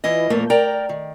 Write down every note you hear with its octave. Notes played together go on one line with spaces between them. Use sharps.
E3 E4 F4 D#5
F2 A#2 A3 A#3 F4 A#4
A#4 D5 G5 A#5
D#3